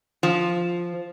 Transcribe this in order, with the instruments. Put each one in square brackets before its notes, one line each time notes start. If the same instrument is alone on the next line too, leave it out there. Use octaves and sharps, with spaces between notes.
[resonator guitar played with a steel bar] F3